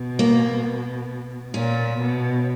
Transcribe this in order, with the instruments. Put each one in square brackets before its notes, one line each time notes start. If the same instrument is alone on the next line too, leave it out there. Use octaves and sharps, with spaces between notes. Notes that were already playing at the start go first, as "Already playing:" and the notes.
Already playing: [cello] B2
[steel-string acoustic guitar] A#3
[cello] A#2 [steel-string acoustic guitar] C#4
[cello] B2